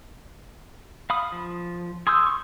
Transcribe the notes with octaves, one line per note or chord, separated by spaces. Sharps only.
F5 B5 D#6
F3
G#4 C6 D#6 E6 G6
C6 C#6